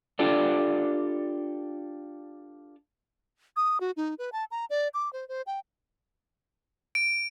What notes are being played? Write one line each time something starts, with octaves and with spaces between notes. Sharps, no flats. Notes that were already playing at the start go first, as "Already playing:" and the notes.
D4 F4 G4 A4 D5
D#6
F#4
D#4
B4
A5
A#5
D5
D6
C5
C5
G5
D7